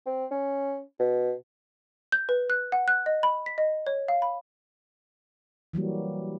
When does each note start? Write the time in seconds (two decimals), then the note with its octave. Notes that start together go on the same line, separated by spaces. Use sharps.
0.06 C4
0.31 C#4
1.00 B2
2.12 G6
2.29 B4
2.50 F#6
2.72 F#5
2.88 F#6
3.06 D#5
3.23 B5
3.46 B6
3.58 D#5
3.87 C#5
4.08 F5
4.22 B5
5.73 E3 F#3 G3 A#3